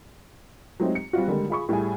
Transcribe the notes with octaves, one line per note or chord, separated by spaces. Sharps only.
F#3 G#3 A3 C4 D#4 G4
C#7
G3 C4 F4 F#4
D3 D#3 G3 G#3 A#3
F4 G#4 B5 C#6
A2 G3 G#4 G#5